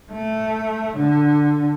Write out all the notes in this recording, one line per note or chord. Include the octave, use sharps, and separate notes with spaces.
A3
D3